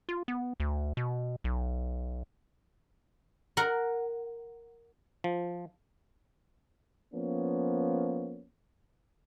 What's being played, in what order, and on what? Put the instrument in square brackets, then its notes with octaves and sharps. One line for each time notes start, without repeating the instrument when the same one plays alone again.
[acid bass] F4
B3
D2
B2
B1
[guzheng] A#4 F#5
[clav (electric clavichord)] F3
[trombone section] F3 A#3 B3 C#4